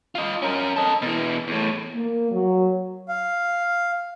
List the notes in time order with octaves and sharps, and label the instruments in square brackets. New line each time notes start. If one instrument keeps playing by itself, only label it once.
[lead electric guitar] F4 D#5
C#4 A#4
A4 D#5
B2 E3
E2 A2
[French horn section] A#3
F#3
[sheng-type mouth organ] F5